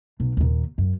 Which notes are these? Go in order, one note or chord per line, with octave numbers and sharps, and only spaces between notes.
B1
D#2 A#2
F#2